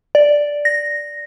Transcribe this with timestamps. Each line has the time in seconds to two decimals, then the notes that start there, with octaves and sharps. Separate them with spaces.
0.15 D5
0.65 A#6